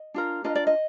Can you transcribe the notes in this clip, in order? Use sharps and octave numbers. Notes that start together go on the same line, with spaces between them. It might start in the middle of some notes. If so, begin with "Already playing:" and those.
Already playing: D#5
D4 F4 A#4
D4 F4 A#4 D#5
D5
D#5